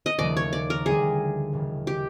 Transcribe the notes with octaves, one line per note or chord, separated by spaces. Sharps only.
D#5
D#2 C#3 F3 A3 D5
C#5
D5
A#4
D2 D3 G3 G#4
E1 D#2 C#3
G4